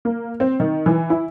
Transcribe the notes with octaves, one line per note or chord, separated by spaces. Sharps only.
A#3
C4
D#3
E3
E4